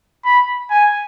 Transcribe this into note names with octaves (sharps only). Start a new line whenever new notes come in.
B5
G#5